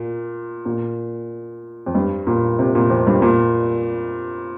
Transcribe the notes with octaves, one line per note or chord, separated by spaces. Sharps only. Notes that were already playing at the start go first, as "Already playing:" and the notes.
Already playing: A#2
A#2
F2
G2
A#2
C3
A#2
F2
G2
A#2